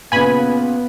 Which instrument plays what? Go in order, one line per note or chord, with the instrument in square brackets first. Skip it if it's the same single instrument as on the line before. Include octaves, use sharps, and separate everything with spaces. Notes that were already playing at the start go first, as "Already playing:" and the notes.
[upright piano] A#2 C#3 [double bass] B3 [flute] B4 [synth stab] G#5 B5